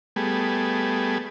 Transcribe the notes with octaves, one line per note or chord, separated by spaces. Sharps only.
G3 A3 B3 G#4